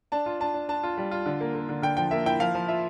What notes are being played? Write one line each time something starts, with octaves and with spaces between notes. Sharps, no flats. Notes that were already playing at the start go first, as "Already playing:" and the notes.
D4 A5
F4
D4 A5
D4
D4 A5
F4
G3
F4
D3
A#3
A#3
D3
D3 G5
F3 G5
A#3 E5
E4 G5
F3 F5
F3
F4 E5